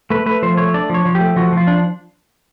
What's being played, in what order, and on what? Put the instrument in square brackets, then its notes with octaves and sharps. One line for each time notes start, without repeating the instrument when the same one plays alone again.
[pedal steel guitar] A3 B4
A3 B4
F3 C5
A3 C#5
D4 D5
F3 C#5
F3
G4
A3
F3 F#4
F3 F4
D4